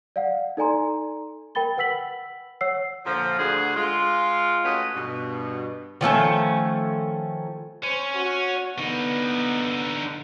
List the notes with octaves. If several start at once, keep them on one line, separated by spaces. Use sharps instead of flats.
D5 F5 F#5
D#4 A4 D5 G#5 A#5 C6
A#4 G5 B5 A6 G7
B4 F#5 E6 B6 F#7
C#5 F#5 E6 C7
A#2 D3 F3
D2 D3 F#4 G#4 C5
G#3 F4
A3 C#4 F#4 B4 D#5
G2 B2
D#3 F3 A3 C#4
C5 C#5 G#5
F#4
D3 B3 D#4